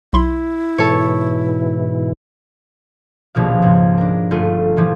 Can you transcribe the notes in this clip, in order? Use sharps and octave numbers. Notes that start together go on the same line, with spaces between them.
B1 E4 B5 C6
G#2 B2 E3 A4 C#5
D#1 A#1 B2 F3 F5
C#2 G#2 G#4
D4 A#4
G1 A3 F4 D#7
A#2 E3 F3 G3